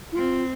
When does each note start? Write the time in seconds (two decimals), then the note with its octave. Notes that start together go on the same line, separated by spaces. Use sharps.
0.12 E4
0.16 C4 F4